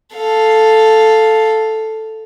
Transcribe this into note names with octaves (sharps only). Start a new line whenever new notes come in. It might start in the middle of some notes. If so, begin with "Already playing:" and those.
A4 F5